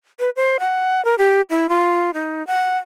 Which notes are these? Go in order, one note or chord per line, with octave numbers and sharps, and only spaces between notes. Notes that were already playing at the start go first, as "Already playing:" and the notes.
B4
C5
F#5
A#4
G4
E4
F4
D#4
F#5